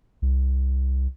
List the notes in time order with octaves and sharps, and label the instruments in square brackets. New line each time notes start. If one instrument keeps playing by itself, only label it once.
[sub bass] C2